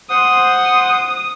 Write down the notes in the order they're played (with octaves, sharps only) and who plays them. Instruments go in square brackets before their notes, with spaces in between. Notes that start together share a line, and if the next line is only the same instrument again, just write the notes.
[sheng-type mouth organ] C5 F#5 C6 [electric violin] D#6